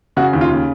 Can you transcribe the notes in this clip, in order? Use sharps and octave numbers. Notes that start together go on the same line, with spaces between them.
C#3 F#4
D#2
F4
C#3